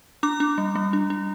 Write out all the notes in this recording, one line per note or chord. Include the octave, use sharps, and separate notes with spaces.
D4 D6
D4
G3
G3
D4
D4